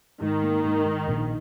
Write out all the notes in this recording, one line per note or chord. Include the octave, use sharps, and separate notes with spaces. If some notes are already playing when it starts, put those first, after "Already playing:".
G#2 D#3
A#3
G#2
G#2
A#1